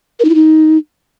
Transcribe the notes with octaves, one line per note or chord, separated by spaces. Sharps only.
A#4
D#4
E4
D#4